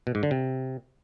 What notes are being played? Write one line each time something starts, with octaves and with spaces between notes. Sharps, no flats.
B2
G#2
D3
C3